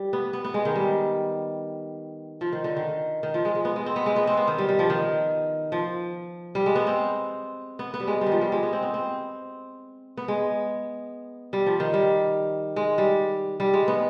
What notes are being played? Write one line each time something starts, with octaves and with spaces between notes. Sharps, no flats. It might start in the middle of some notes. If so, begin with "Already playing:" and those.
Already playing: G3
B3
B3
B3
G#3
D#3
G3
F3
D#3
D3
D#3
D#3
F3
G#3
G#3
B3
G#3
C4
B3
G#3
B3
C4
B3
D#3
G3
G3
F3
D#3
F3
G3
G#3
B3
C4
B3
B3
G3
G#3
G3
D#3
F3
G3
G#3
B3
C4
B3
C4
B3
G#3
G3
F3
D#3
G3
G#3
G3
G3
G#3
B3